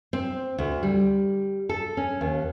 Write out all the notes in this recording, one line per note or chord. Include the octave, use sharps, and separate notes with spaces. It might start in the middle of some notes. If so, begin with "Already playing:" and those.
C4
D2
G3
A4
C#4
D#2